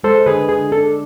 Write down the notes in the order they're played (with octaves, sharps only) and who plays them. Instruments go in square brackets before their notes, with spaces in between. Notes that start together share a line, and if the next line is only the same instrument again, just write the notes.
[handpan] G#3 [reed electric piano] A4 C5
[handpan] D3 [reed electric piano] G#4 B4
[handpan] D3 [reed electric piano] G#4
[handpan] D4 [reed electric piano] A4